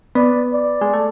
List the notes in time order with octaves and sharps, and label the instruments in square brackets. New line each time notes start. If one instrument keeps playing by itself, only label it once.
[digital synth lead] B3 [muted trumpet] D5
[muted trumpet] D5
[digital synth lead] G#3
A3